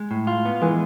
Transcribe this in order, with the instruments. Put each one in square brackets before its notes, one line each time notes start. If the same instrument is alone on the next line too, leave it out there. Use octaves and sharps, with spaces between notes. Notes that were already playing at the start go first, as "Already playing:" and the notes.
Already playing: [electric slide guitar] G#3
A2
F4
B3
[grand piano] E3 [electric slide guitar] G#3